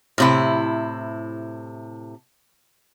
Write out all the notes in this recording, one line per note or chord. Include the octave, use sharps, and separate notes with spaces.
A2 C3 E4